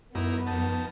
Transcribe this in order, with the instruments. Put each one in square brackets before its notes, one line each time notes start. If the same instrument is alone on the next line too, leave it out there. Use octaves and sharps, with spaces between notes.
[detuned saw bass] F#2 [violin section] B3 [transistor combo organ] D#4 E4 A#4
[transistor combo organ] F2 D#4 A5